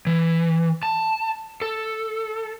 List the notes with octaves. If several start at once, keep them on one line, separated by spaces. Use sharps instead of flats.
E3
A5
A4